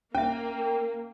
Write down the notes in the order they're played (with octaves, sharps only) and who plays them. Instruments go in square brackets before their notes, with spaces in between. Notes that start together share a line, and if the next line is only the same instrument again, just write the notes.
[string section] A#3 [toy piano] C#4 E5 [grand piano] G5